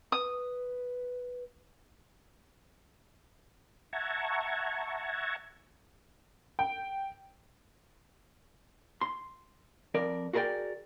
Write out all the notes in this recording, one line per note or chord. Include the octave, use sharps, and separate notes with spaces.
B4 D#6
E5 F#5 A5 A#5 C#6 G#6
G5
C6
F2 A#4 D5
F#4 G#4 A#4 B4 D5 G5